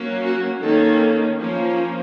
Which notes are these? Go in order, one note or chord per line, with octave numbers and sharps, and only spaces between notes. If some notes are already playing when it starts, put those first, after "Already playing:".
Already playing: F#3 A#3 C#4
F#4
D#3 A#3 C#4 A4
F3 A#3 C#4